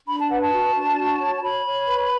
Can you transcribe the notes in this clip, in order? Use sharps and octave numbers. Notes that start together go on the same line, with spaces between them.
D4 B5
A5
B4 F#5
A5
F#4
D4
F#4
C#5
A5
C#5 B5
C#5
B4